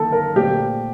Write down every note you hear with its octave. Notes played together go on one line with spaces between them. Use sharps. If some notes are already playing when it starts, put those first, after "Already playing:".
Already playing: D#3 A#3 D#4 A4
A#4
A#2 A3 C4 G4